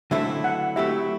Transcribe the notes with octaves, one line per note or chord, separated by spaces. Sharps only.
D3 F#3 A3 C4 E4 E5
F#5
F#3 A3 C4 E4 G4 E5